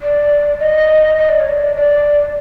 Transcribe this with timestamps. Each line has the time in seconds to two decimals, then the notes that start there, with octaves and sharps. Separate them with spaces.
0.02 D5
0.60 D#5
1.18 D#5
1.29 D5
1.39 C#5
1.49 D5
1.76 D5